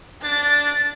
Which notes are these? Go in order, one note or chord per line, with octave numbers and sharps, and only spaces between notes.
D4 A6